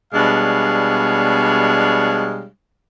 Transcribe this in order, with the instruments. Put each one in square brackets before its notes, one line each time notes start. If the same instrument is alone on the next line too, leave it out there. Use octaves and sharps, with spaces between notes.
[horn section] B2 G3 G#3 D4 C#5 F5